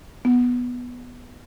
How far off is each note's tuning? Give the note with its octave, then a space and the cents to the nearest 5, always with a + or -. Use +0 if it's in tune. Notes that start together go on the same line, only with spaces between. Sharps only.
B3 -5